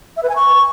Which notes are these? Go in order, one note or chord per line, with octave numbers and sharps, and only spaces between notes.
E5
B4
G#5
C#6